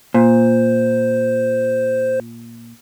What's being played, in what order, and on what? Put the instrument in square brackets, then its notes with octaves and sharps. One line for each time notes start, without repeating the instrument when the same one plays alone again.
[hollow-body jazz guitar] A#2 [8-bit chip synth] C5